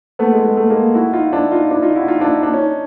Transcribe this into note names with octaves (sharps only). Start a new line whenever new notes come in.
A3 B3
G#3
G#3
A3
G#3 A#3
E4 F#4
D#4 F4
D4 E4
D#4 F4
D4 E4
D#4 F4
E4 F#4
D#4 F4
D4 E4
D#4
D4
C#4 D#4